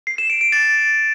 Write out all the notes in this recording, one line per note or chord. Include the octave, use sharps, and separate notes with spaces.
C7
E7
D7
D7
A6